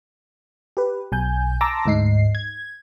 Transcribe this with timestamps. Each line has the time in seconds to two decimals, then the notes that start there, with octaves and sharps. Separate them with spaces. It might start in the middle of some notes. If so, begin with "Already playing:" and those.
0.77 G4 B4
1.12 B1 G#5 G6
1.61 A5 A#5 C6 D6 E6 A#6
1.86 D2 G#2 D#4 C7
2.35 G#6